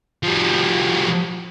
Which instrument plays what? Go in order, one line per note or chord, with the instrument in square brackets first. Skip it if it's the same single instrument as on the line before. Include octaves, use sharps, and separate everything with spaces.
[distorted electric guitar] F3 G3